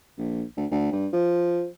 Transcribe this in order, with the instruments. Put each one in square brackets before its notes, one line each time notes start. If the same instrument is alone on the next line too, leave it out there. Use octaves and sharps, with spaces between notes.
[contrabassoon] A#1
D2
D2
G2
F3